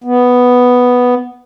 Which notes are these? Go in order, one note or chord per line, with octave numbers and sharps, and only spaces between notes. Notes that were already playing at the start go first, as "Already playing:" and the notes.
B3